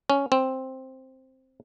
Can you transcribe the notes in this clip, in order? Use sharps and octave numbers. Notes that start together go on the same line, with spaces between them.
C#4
C4